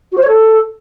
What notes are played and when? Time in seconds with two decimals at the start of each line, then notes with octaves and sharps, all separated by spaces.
0.12 F#4
0.17 C5
0.23 C#5
0.28 A4